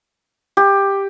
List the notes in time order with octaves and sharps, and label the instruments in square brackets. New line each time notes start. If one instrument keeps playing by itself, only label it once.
[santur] G4